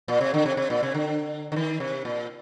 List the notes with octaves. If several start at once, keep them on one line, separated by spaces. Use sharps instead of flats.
A#2
C3
D3
C3
C3
A#2
C3
D3
D3
D#3
C3
A#2